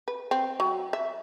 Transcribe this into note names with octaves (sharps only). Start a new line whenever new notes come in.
B4
C4
F#3
E5